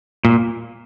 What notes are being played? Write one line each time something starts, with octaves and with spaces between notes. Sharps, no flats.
A#2